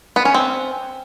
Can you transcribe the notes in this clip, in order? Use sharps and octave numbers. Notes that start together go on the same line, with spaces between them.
B3
C#4
C4